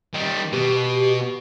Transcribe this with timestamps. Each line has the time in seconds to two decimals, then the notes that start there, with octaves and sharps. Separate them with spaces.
0.14 D#3 G3
0.52 B2 G4